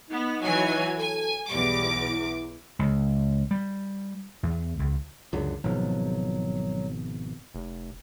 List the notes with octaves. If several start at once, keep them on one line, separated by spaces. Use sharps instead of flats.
B3 D#4
E3 F#3 G#5
A4 G#5
B1 E2 G3 D6
E4
C#2
G3
E2
C#2
C#2 F#2 D3
G#1 B2 F3 F#3
F1